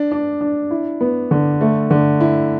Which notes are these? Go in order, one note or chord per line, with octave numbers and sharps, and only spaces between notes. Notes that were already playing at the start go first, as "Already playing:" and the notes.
Already playing: D4
D4
D4
E4
B3
D3
A3
D3
E4